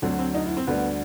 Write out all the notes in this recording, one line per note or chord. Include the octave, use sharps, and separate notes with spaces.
D2 D3 F#3 C4
C4
D#4
E4
C4
D2 D3 G3 B3